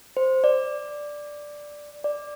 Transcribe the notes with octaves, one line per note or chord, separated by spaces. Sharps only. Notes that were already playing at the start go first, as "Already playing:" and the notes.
C5
D5
D5